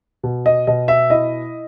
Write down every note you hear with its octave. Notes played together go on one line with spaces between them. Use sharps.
B2
D#5
B2 D#5
E5
E4 D#5